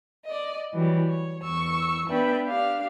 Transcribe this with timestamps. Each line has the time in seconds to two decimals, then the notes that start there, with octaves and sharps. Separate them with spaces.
0.25 D5 D#5
0.73 E3 F#3 G3
1.09 C#5
1.42 E2 C#6 E6
2.07 B3 D4 B4 E5 G5
2.47 D4 G4 F5